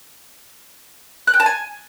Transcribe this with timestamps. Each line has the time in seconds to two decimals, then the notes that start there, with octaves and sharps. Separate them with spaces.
1.27 F#6
1.34 G5
1.40 A5
1.46 G#5